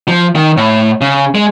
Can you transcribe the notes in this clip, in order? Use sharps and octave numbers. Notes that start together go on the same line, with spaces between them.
F3
D#3
A2
C#3
G#3